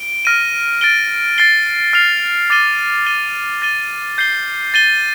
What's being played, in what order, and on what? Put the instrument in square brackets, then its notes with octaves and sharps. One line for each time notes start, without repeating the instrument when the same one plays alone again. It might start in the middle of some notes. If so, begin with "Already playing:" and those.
Already playing: [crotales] D7 G7
F6 A#6 D#7
A6 D7 G7
A6 C7 G7
F6 C7 F7
D6 A6 D#7 G7
A6 D#7 G7
A6 D#7 G7
G6 C7 G7
A6 D#7 G7